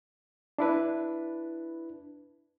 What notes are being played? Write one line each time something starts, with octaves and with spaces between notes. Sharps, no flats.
D4 E4 B4